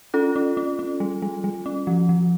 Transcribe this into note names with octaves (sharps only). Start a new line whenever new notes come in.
C#4 F4 A4
C#4
C#4
C#4
G3
G3
G3
C#4
F3
F3